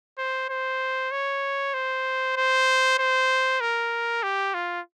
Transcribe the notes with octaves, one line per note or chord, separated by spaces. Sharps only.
C5
C5
C#5
C5
C5
C5
A#4
G4
F4